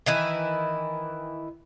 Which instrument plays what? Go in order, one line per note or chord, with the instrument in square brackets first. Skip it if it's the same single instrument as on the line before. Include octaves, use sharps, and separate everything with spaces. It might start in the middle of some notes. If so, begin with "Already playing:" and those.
[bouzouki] D#3 E3 E4